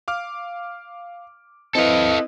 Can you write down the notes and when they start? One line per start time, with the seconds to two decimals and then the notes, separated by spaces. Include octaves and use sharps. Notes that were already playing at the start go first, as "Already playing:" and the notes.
0.08 F5 D6 F6
1.75 C4 E4 A4 B4 D#5 F5